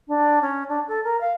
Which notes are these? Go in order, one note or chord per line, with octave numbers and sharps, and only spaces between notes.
D4
C#4
D4
A4
A#4
F5